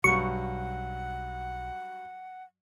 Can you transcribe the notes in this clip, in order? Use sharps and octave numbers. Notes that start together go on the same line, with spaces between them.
B1 G2 F#3 F#5 C#6